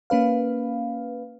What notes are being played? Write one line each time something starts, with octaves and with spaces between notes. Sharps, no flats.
A#3 C#4 B4 F5